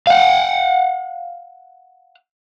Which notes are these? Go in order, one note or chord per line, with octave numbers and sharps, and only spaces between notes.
F5 F#5